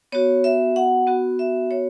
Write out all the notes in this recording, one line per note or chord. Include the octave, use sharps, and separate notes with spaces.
B3 F#4 C#5
E5
F#5
B3 F#4
E5
C#5